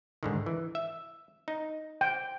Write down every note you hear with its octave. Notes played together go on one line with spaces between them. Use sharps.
G#2 D3 D#3
E3
E5
D#4
G5